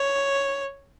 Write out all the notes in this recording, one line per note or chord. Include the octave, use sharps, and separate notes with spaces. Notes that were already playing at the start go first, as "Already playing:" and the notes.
Already playing: C#5